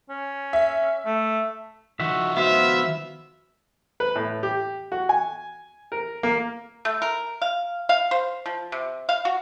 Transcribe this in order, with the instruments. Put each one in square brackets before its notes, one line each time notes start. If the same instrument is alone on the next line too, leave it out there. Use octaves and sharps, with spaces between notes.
[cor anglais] C#4
[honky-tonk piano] E5
[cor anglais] A3
[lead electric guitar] D#3 F3 [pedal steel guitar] F#4 E5
[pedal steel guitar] B3 C5 F5 [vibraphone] F#4 [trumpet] E5
[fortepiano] B4
A2
G4
F#4
G#5
A#4
A#3
[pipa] A3
A#4
F5
F5
C5
F3
C3
F5
F#4